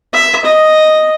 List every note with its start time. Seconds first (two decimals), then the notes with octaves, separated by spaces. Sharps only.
0.13 E5
0.45 D#5